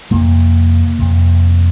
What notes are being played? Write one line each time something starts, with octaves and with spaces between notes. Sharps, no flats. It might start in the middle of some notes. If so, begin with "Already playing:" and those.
F2 C3 A#3
F2 C3